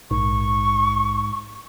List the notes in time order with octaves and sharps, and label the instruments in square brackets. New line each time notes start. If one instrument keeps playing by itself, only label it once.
[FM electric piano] A#1 [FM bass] G#2 [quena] C#6